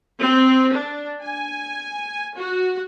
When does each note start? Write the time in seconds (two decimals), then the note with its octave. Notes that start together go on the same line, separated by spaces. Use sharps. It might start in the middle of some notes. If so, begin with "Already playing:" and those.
0.19 C4
0.73 D4
1.23 G#5
2.37 F#4